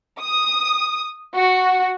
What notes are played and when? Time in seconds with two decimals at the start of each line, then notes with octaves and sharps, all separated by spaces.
0.20 D#6
1.35 F#4